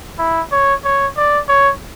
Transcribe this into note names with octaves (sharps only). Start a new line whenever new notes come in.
E4
C#5
C#5
D5
C#5